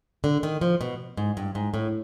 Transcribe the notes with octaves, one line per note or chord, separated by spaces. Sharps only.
D3
D#3
F3
B2
G#2
G2
G#2
A2